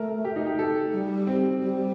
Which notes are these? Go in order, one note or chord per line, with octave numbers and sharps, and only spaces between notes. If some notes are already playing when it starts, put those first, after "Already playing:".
Already playing: A3 A#4
G4
D#4
G4
A4
G3
C4
G3